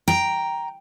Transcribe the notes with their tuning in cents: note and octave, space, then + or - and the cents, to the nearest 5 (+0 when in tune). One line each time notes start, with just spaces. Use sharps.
G5 +0 A#5 +5